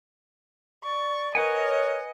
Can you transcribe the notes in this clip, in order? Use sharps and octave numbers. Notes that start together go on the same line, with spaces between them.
D5 C#6
A#4 B4 C#5 D#5 F#5 G#5